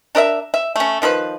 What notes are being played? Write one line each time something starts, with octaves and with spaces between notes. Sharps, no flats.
D4 A#4 D#5 E5
E5
A3 C#4
D#3 F3 D#4 B4